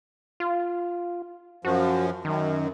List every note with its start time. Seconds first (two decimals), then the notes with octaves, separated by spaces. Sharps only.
0.40 F4
1.65 F#2 F3 F#4
2.25 F#2 D#3